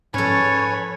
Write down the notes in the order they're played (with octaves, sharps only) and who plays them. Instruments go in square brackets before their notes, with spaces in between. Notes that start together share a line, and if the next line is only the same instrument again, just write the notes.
[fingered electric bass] G#2 F3 [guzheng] C#4 A4 [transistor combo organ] B4 G#5 [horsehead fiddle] C#5